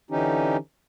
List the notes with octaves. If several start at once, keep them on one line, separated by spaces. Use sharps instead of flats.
D3 E3 C#4 D#4 G4